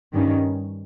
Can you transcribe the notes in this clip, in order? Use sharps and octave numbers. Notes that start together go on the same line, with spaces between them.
G2 D#3 G3 C#4